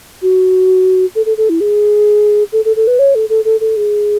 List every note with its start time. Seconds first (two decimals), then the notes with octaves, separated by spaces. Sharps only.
0.22 F#4
1.15 A4
1.26 A4
1.37 A4
1.49 E4
1.60 G#4
2.52 A4
2.65 A4
2.76 A4
2.87 B4
2.99 C#5
3.15 A4
3.29 A4
3.45 A4
3.60 A4
3.76 G#4